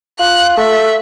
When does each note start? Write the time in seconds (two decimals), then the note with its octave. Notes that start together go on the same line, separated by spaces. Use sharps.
0.19 F4 F#6
0.57 A3 E5